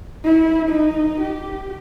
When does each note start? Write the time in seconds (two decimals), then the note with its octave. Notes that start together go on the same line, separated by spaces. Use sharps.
0.24 E4
0.69 D#4
1.20 G4